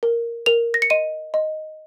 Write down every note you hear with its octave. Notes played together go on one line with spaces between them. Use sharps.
A#4
A#4 F7
A#6
C#7
D#5 D#7
D#5